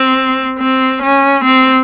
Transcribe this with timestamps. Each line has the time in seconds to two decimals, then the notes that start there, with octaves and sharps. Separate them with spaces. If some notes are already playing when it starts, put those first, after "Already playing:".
Already playing: C4
0.59 C4
1.02 C#4
1.44 C4